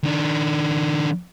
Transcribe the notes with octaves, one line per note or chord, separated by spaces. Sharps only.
D#3 D4